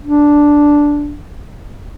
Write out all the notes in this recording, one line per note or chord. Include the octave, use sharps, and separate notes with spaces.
D4